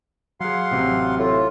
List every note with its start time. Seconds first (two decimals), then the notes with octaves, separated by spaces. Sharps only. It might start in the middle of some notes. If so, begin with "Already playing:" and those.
0.40 F#3 G#4 F5 F#5 C6
0.71 A1 C3 F#3
1.19 A2 F4